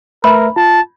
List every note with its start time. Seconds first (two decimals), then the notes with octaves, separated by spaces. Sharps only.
0.24 A3 A#4 B4 E5 B5
0.56 F4 A5